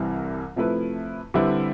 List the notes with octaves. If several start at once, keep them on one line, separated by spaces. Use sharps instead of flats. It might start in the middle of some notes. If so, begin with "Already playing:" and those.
Already playing: C2 C3 E3 G3
C3 F3 A3 E4 B4
D3 G3 C4 E4 B4